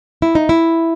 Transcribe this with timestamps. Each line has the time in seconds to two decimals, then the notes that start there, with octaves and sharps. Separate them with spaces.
0.22 E4
0.35 D#4
0.49 E4